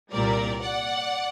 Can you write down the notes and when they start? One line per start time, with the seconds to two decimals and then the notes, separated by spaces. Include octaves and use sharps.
0.12 C2 A#2 G3 A#4 D5
0.61 D5 F#5